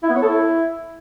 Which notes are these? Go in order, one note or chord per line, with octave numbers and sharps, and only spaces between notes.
E4
B3
C#5
A4
E4